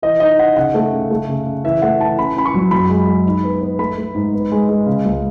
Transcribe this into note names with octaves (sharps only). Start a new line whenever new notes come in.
E3 D#5
D#4 D#5
D#4 F#5
C#3 F#5
A3
C#3
A3
C#3
C#3
E3 E5
A3 F#5
E3 A5
C#4 B5
C#4 B5
C#6
F#3
F#2 B5
G#3
G#3
D#4
B3
B3
A3 B5
A3
G#2
B3
G#3
G#3
C#3
C#2